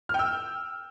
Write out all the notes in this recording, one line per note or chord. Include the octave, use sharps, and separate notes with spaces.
G5 E6 F6